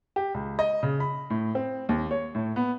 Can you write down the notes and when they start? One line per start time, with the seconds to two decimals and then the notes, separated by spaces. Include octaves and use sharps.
0.16 G4
0.34 C#2
0.59 D#5
0.83 C#3
1.00 B5
1.30 A2
1.55 C4
1.89 D#2
2.11 C#5
2.35 A2
2.56 B3